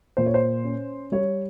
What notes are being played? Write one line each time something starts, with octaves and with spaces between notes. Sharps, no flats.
A#2 C5
C#5
C5
C#4
G3 C#5